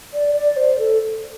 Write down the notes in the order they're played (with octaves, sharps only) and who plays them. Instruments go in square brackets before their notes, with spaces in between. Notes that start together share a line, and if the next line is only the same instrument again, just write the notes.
[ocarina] D5
D5
C5
A4